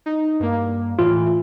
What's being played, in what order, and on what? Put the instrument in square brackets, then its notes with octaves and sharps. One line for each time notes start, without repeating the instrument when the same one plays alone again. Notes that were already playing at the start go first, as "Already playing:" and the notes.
[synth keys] D#4
G2 A#3
[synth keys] A2 E3 [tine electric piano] F4